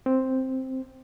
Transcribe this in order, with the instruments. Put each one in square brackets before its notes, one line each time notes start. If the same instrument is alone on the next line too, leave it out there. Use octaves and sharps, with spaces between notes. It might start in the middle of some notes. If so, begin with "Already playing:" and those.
[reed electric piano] C4